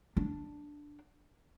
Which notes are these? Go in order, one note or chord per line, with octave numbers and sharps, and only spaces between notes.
D4